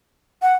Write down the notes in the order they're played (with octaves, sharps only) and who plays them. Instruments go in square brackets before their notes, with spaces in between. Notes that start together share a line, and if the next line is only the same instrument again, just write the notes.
[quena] F#5